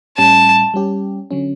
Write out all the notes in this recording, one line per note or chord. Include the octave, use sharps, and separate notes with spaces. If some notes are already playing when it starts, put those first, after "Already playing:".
A2 G3 C#4 A5
G3 C#4 G4
D3 F#3 C#4